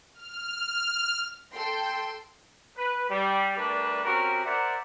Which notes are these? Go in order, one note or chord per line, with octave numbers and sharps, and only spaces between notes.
F6
A4 G5 C6
B4
G3
G3 A3 D4 A#4 B4
C4 C#4 F#4 G4 A#4
A#4 C5 D5 E5 F#5